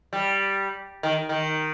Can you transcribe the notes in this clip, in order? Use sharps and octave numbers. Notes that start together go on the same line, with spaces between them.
G3
D#3
D#3